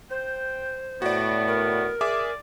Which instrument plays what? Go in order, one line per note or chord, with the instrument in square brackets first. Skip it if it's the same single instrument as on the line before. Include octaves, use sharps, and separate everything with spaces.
[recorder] C5 [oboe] G5
[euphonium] A2 [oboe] B3 [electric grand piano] F#4 D5
[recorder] A#4
[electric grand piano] G#4 E5 D6 [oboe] D5